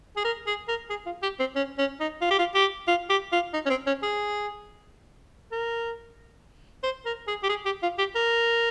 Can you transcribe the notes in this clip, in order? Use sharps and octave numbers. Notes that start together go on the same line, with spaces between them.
G#4
A#4
G#4
A#4
G#4
F4
G4
C4
C#4
C#4
D#4
F4
G4
F4
G4
F4
G4
F4
D#4
C#4
C4
C#4
G#4
A#4
C5
A#4
G#4
G4
G#4
G4
F4
G4
A#4